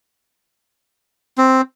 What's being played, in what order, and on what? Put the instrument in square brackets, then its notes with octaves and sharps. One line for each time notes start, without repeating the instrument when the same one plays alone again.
[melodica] C4